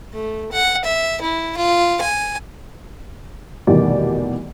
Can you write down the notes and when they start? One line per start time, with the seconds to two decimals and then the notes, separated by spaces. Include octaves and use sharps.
0.13 A3
0.52 F#5
0.84 E5
1.22 E4
1.57 F4
2.02 G#5
3.67 F1 B2 D#3 E3 G3 D5